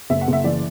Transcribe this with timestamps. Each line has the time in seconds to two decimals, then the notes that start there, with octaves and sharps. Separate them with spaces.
0.10 F#1 E5
0.21 F#5
0.28 F#1
0.33 E5
0.44 E3 D5